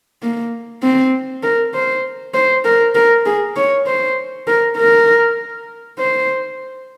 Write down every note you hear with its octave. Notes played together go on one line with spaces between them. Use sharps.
A#3
C4
A#4
C5
C5
A#4
A#4
G#4
C#5
C5
A#4
A#4
C5